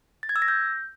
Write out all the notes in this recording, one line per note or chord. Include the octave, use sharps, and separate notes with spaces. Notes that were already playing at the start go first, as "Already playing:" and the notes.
A6
G#6
E6
A#6
G6